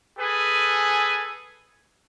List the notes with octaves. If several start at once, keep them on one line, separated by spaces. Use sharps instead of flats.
G#4 A4 B4 G#5